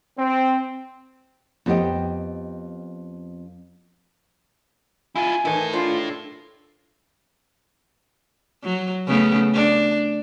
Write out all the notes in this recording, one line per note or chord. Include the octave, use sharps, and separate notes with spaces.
C4
F2 B3 G4 C5 D#5 G5
E4 F4 G#5
D#3 E3 E4 A4
D4 F4 C5
F#3
C#3 A3 B3
D4